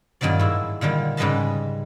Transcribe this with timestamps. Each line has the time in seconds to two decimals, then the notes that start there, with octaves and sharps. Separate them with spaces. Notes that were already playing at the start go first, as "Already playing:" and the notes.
0.21 G2 A#2 D#3 F#3 D5
0.39 G#2 E4
0.81 A#2 D3 D#3 G3
1.17 G#2 C#3 G3 B4 D#5 A5